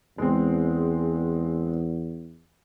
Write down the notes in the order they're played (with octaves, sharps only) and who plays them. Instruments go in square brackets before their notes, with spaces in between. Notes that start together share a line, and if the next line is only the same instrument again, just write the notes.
[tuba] E2 [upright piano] G#3 C4